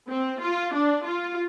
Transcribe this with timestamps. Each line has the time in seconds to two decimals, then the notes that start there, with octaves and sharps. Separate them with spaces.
0.09 C4
0.41 F4
0.75 D4
1.07 F4